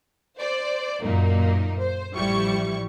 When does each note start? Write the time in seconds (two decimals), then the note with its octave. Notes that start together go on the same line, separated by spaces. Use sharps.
0.39 C5 D5
1.02 F#2 A#2 A#3 D#4
1.80 C5
2.16 A1 F3 G3 E4 C#6